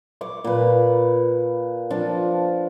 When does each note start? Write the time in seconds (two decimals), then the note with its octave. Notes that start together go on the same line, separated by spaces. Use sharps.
0.21 C#6 D6
0.44 A#2 B4
1.90 F3 D4 A5